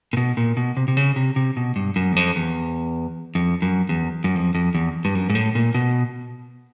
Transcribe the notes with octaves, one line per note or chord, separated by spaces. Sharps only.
A#2
B2
A#2
B2
C3
C3
C#3
C3
C3
B2
G2
F#2
E2
F2
E2
F2
F#2
E2
F#2
F2
F2
E2
G2
F#2
G#2
A2
A#2
B2